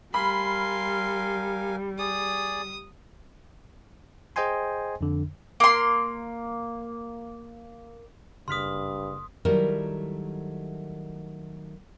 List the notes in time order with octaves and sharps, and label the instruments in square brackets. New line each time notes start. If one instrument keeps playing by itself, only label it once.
[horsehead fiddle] G3 [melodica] A#4 F5 G#5 [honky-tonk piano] B5 [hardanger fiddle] C6
[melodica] G#4 D5 [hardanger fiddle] D#6
[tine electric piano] G#4 C5 D#5 G5 G#5 C6
F2 D3
[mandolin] A#3 C6
[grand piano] F#1 F6 B6 [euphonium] G2 [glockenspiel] C6 D#6
[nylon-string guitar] D#3 F#3 G3 A3 E4 A#4